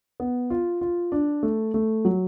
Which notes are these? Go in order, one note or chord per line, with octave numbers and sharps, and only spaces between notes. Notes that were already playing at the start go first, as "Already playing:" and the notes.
B3
F4
F4
D4
A3
A3
F#3